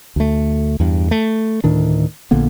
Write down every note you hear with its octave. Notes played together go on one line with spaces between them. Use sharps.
D2 A3
E2 G2
A3
D2 A2 D#3 D4
A#1 D3 A#3 B3